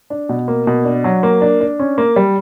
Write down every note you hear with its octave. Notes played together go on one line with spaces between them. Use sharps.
D4
B2
A#3
B2
D4
F#3
A#3
D4
D4
C#4
A#3
G3